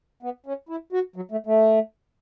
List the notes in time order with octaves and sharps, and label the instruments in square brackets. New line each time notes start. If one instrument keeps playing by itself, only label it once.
[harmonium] B3
C#4
E4
F#4
F#3
A3
A3